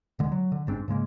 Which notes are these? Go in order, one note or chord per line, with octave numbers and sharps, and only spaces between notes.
D1 D3 G#3
F#3
D3
G1 G#2 C4 D4
G#2 C#3 G#3 A#3